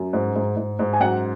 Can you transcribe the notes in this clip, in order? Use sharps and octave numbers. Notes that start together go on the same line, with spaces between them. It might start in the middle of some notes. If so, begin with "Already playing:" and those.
Already playing: F#2
G#2
G#2
G#2
G#2
G#5
F#2 F#5